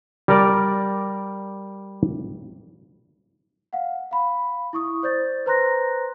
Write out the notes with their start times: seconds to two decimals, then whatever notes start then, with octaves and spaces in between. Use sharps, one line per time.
0.28 G3 A#4 D5
3.73 F5 F#5
4.11 F5 B5
4.73 E4 C#6 D#6
5.03 C5 D5 G6 A6
5.46 B4 C5 A#5 C6 F#6 A#6